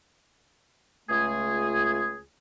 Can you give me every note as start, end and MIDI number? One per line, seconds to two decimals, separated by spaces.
1.09 2.20 37
1.09 2.20 57
1.09 2.20 65
1.09 2.20 68